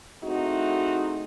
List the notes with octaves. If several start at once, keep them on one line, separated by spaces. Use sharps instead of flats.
A3 C4 D#4 E4 F#4 G#4